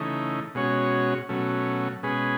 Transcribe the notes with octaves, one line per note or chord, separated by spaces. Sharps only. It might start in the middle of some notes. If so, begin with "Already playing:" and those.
Already playing: C#3 E3 A3 D#4
B2 G#3 C#4 F#4 C#5
B2 F#3 A3 C#4
B2 G#3 C#4 G#4 B4